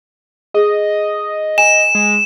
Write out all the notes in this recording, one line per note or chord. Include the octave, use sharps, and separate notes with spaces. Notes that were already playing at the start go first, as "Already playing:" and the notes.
G#4 D#5
G#5 E7
G#3